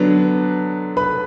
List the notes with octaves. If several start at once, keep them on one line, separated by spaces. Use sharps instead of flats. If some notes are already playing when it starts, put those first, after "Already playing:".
Already playing: D3 F#3 B3 D4
B4 B5